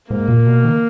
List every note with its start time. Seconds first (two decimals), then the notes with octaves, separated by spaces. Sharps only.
0.10 G#2 A#3
0.28 A#2
0.46 B2
0.64 D#3